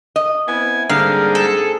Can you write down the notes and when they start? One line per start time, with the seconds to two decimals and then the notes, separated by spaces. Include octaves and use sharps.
0.16 D#5
0.48 B3 C4 E4 G#5
0.89 G#2 D3 G3 A#3 C4 G#4 F5
1.35 A4